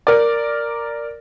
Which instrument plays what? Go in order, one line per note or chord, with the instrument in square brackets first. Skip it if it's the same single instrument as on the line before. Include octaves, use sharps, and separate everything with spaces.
[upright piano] A#4 D5